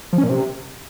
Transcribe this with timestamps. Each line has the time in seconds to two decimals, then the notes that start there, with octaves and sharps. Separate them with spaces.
0.13 F3
0.18 C#4
0.24 A#2
0.29 C3